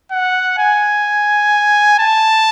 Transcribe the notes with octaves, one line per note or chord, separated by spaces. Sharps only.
F#5
G#5
A5